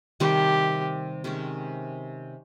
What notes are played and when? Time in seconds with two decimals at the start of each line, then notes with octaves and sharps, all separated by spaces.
0.20 C3 D#3 G3 C4 G4
1.24 C3 D#3 G#3 C#4